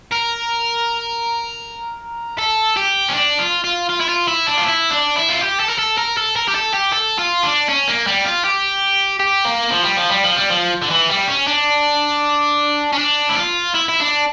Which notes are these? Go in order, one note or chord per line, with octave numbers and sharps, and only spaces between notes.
A#4
A4
G4
C#4
D4
F4
F4
F4
E4
F4
E4
D4
F4
E4
D4
E4
F4
G4
A4
A#4
A4
A#4
A4
A#4
G4
A4
G4
A4
F4
D4
C#4
A#3
G3
F4
G4
G4
A#3
F3
G3
F3
G3
F3
G3
F3
D3
E3
G3
C#4
D4
C#4
D4
E4
F4
E4
E4
D4